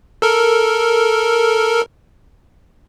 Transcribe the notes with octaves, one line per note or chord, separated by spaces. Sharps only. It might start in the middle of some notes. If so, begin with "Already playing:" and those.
A4 A#4